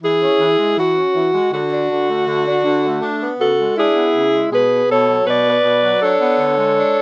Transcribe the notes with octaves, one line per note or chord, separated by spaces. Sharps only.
E3 E4 G#4
C#4
E3
G#3
E3 F#4
C#4
E3
G#3
D3 F#4
D4
D3
A3
D3
D4
D3
A3
D4
B3
C#3 F#4 A4
G#3
D4 E4 G#4
B3
C#3
G#3
B2 G#4 B4
B3
B2 A4 C#5
F#3
B2 B4 D5
B3
B2
F#3
D4 A4 C#5
B3
D3
G#3
D4